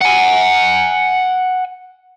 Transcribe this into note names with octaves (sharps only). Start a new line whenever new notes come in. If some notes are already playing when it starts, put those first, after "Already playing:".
F#5 G#5